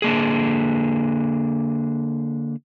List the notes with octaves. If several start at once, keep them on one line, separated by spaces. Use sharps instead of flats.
D3 A#3 G#4